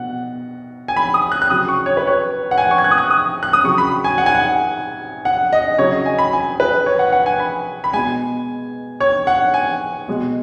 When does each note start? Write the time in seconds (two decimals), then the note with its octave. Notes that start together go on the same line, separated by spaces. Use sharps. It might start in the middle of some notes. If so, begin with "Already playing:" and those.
Already playing: B2 F#5
0.88 G#5
0.97 B5
1.14 D#6
1.32 F#6
1.42 F#6
1.50 C#3 F#3 D#6
1.68 C#6
1.86 C#5
1.97 B4
2.07 C#5
2.51 F#5
2.58 G#5
2.71 C#6
2.78 G#6
2.84 F#6
2.91 D#6
2.98 F#6
3.10 D#6
3.43 F#6
3.53 D#6
3.64 C#3 F#3 C#6
3.78 B5
4.04 G#5
4.18 F#5
4.26 G#5
4.35 F#5
5.25 F#5
5.53 D#5
5.79 C#3 F#3 C#5
5.92 D#5
6.06 G#5
6.19 B5
6.33 G#5
6.60 B4
6.86 C#5
6.99 F#5
7.12 F#5
7.26 G#5
7.40 B5
7.84 B5
7.93 B2 G#3 G#5
9.00 C#5
9.27 F#5
9.54 G#5
10.08 B2 G#3